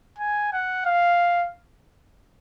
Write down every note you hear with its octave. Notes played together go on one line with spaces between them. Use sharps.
G#5
F#5
F5